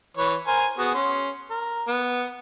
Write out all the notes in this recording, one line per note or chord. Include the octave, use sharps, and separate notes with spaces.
E3 B4 C#5
A#4 C5 G#5
B3 F#4 G#4
C#4 C6
A#4
B3